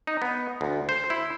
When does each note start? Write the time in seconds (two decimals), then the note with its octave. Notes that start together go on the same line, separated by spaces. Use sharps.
0.07 D#4
0.22 B3
0.61 D2
0.89 C5
1.10 E4